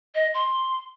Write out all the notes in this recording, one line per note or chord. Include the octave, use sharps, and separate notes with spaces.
D#5
C6